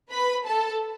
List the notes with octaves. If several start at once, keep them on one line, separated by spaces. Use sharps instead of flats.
B4 B5
A4 A5